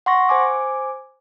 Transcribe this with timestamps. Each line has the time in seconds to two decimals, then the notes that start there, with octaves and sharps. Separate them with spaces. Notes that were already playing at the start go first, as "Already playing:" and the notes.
0.06 F#5 C6 C#6 A#6
0.29 C5 G#5 D6